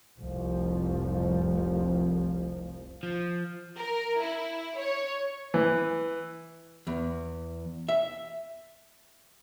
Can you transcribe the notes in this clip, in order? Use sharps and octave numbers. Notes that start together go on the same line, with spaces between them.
F1 C2 F2 F3
F3
A#4
E4
C#5
E3
E2
E5